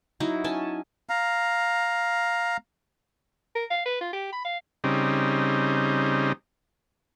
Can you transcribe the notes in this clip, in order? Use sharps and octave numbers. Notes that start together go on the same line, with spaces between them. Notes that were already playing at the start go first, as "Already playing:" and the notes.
F#3 D#4 E4
C#4 G#5 A5
F5 A#5
A#4
F5
B4
F4
G4
B5
F5
C#3 G3 C4 D#4